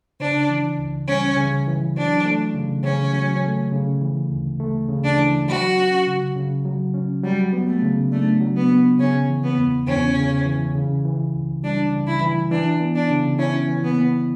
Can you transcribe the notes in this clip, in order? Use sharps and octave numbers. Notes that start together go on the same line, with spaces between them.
C#3 D4
E3
C#2
G3 C#4
C#3
E3
F#3 D4
A3
C#3
C#3 C#4
F#3
A3
C#3
E3
D2
A3
C#3
D4
E3
F#3 F#4
C#4
C#3
C#3
F#3
C#4
F#3 G3
B3
A3
C#3
A3 D4
F#3
B3
B3
C#3 C#4
E3
B3
E2
E2 C#4
C#3
E3
C#3
E3
C#2
G3 D4
C#3
E4
E3
E3 D4
B3
D4
C#3
C#4 E4
E3
B3
B3